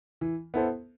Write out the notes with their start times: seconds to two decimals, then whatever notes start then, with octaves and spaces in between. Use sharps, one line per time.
0.21 E3
0.54 B3 E4 A4 C5